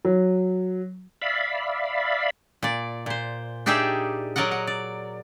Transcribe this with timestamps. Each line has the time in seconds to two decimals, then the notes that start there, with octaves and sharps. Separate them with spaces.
0.05 F#3
1.22 D5 E5 F5 B5
2.63 A#2 D5
3.06 A#2 C5
3.66 D4 D#4 G4 G#4 D5 E5
4.36 F#3 A#4 D5 D#5 F#5
4.51 F#5
4.67 D5